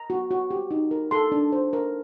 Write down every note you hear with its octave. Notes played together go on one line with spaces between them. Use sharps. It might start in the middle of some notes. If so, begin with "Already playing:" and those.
Already playing: A#5
F#4
F#4
G4
D#4
A#4
A4 C6
D4
C5
A#4